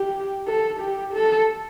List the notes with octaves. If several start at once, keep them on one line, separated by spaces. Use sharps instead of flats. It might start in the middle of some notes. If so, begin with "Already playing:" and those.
Already playing: G4
A4
G4
A4